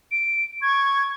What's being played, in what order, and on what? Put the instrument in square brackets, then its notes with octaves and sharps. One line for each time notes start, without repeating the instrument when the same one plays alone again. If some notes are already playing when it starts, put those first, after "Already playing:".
[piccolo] D7
[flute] C#6 [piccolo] G#6